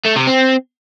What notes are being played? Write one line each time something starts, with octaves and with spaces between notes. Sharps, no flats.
A3
C3
C4